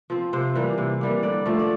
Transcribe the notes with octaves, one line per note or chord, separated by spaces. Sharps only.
F3 C4
C3 C5
E3 G3 A#3
C3
E3 G3 A#3
D3 D5
F3 A3
D5